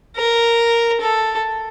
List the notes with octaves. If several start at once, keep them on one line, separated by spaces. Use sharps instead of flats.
A#4
A4